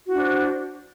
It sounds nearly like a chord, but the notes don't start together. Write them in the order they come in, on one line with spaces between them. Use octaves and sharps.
F#4 E4 D4 C5